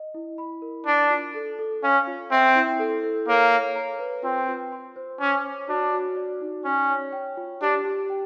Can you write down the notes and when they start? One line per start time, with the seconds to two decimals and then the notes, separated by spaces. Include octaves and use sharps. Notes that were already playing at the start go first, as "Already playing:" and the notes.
Already playing: D#5
0.14 E4
0.38 B5
0.62 A#4
0.86 D4 D5
1.10 F4
1.34 A4
1.59 A4
1.83 C#4 F5
2.07 F4
2.31 C4 E5
2.56 E4
2.79 A4
3.03 A4
3.28 A#3 C#5
3.52 C#5
3.75 A#5
3.99 B4
4.23 C4 F4
4.48 F4
4.72 C6
4.96 C5
5.20 C#4 D6
5.45 C#5
5.68 D4 F#4
5.93 F#4
6.17 D5
6.41 D#4
6.64 C#4 C#5
6.89 C#5
7.13 G5
7.37 F4
7.61 D4 G4
7.85 G4
8.10 G5